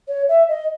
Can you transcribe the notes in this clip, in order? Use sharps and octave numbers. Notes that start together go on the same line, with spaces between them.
C#5
E5
D#5